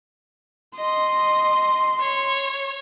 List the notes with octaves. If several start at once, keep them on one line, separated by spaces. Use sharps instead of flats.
D#5 C6
C#5